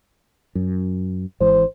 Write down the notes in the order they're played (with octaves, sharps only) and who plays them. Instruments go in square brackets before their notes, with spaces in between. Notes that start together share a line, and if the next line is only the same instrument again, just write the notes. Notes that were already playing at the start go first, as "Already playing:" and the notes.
[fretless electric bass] F#2
[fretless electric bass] G#1 G#2 E3 [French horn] C5